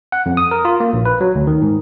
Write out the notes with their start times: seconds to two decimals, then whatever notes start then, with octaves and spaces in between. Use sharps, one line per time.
0.12 F#5
0.26 F2
0.37 D#6
0.51 A#4
0.65 F4
0.80 A#3
0.93 A#1
1.05 B4
1.21 F#3
1.35 D2
1.47 D#3
1.62 G#2